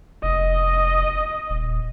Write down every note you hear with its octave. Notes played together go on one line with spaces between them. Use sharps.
F1 D#5
D#1